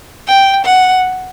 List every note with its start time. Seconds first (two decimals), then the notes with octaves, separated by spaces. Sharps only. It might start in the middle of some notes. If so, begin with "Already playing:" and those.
0.27 G5
0.66 F#5